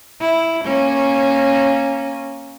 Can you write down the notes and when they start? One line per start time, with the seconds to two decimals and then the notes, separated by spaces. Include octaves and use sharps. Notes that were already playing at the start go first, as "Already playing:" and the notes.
0.21 E4
0.64 A#3 C#4